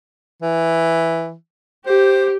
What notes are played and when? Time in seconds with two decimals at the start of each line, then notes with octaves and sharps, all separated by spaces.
0.42 E3
1.86 G4 C5